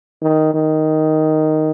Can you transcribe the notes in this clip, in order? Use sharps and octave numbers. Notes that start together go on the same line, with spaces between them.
D#3
D#3